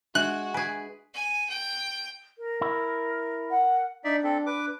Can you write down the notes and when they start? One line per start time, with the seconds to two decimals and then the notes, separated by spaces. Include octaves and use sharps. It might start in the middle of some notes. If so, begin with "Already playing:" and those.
0.15 G#3 D4 F#4 E5 F#6
0.54 G#4 B4 G#5
1.14 G#5
1.49 G5
2.38 A#4
2.61 E4
3.51 F#5
4.04 D4 D#4 D5 E5
4.24 C4 A4
4.46 B4 D6